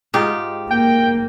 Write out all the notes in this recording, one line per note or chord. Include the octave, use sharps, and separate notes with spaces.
G#2 D#4 F4 G4
A#3 G5